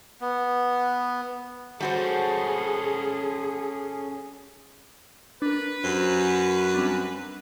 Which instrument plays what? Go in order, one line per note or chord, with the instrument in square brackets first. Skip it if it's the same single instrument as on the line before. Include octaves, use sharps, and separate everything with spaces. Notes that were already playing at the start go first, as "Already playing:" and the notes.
[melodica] B3
[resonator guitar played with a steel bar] G3 F#4 C5 [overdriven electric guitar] C#4 A4 [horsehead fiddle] G#4
[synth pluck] D4 A#4 [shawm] B4
[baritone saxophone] F#2 [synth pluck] G4 C5
[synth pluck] G3 C4 D4